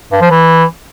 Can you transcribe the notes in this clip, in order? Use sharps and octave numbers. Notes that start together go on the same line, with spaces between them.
G2
F3
E3